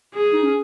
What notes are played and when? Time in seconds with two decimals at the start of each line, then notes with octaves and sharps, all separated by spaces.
0.14 G#4
0.33 D#4
0.43 C#4